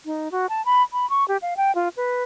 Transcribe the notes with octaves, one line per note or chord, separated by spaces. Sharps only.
D#4
F#4
A5
B5
B5
C#6
G4
F5
G5
F4
B4